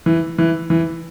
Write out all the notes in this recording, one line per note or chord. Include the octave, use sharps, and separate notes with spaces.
E3
E3
E3